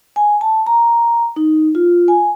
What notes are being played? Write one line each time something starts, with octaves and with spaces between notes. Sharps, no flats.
G#5
A5
A#5
D#4
F4
G#5